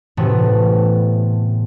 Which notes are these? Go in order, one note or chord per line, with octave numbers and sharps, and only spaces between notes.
A2 C3 E3 A3 B3